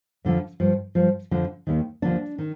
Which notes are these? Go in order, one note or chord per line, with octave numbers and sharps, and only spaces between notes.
F2 D3 F3
G2 F3
G2 F3
F2 D3 F3
D#2 D#3
D#2 D3 F3 D4
D#3